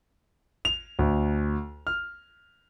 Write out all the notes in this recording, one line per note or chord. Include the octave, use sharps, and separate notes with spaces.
F7
D2
F6